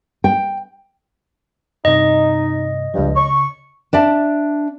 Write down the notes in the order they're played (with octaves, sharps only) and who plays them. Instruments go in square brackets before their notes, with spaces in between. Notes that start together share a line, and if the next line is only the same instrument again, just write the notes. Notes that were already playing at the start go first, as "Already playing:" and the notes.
[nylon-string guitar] G5
[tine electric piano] G2 C3 [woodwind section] D#4 [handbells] D#5
[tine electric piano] C#2 F3 [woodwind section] G2
[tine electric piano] C#3 [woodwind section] C#6
[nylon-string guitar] D4 D5 E5 A5